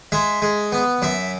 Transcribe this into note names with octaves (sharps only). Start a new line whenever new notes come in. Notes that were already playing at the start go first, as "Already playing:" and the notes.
G#3 E5
G#3
B3
F#2 E5